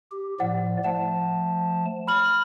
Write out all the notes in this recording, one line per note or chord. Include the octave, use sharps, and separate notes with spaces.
G4
A2 F3 D5 F#5
F3 A3 F#5 A5
B5 F6 F#7